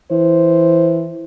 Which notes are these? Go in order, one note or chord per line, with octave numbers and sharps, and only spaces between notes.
E3 C5